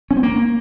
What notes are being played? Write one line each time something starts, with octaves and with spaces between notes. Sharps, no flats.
C#4
C4
A#3